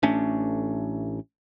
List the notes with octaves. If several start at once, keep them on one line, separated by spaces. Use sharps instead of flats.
A1 A3 C#4 D4